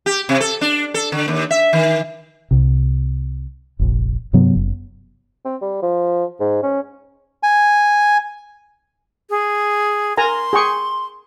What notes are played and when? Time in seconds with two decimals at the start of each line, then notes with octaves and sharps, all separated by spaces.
0.06 G4
0.29 C3
0.41 A4
0.61 D4
0.94 A4
1.12 D3
1.28 D#2
1.51 E5
1.73 D#3
2.51 C2 C3
3.79 F1 A#1
4.33 G2 C3 F#3 B3
4.55 F#1
5.45 C4
5.61 G3
5.83 F3
6.40 G#2
6.63 C#4
7.43 G#5
9.30 G#4
10.17 A#4 G#5 A#5 C6
10.53 G#4 G5 C#6